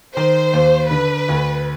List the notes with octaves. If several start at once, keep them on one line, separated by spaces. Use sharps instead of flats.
D#3 C5
D#2
D3 B4
D2